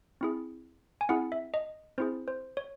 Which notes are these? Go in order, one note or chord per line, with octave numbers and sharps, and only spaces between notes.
C4 E4 G#4
G#5
C4 E4 G#4 F#5
E5
D#5
C4 E4 G#4 C5
C5
C#5